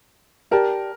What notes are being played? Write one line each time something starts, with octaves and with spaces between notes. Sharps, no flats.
G4 A#4 D5 A5